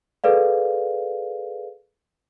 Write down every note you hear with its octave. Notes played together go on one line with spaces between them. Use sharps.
G#4 A4 B4 D5 F5